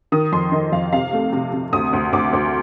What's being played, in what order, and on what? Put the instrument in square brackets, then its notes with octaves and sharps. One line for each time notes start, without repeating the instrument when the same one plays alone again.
[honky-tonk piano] D#3 D#6
F2 C6
D#3 D#5
F2 F5
C3 F5
A3
C3
C3
D2 D#6
D2
D2 D6
D2